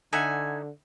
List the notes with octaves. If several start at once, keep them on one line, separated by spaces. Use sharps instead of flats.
D3 D#4 E5 F#5 G#5